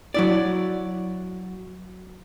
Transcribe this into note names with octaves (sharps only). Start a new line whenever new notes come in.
F#3 E4 D5